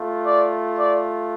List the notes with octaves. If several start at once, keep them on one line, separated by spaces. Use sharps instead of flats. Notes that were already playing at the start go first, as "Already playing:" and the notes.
Already playing: A3 F4
D5
D5